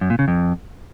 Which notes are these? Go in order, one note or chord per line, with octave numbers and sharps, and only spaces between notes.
F#2
A#2
C#3
F2